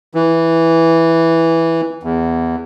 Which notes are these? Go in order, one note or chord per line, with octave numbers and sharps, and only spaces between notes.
E3
E2